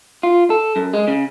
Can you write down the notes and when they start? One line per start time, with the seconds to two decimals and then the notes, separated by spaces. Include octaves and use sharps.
0.23 F4
0.50 A4
0.76 F#2
0.94 G#3
1.08 C#3